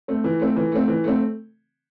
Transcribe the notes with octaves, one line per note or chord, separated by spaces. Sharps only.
A3 C4
E3
A3 C4
E3
A3 C4
E3
A3 C4